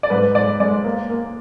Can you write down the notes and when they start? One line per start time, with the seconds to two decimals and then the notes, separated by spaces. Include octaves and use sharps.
0.03 D5
0.10 G#2 B4
0.35 G#2 D5
0.60 G#3 D5
0.84 A#3
1.10 A#3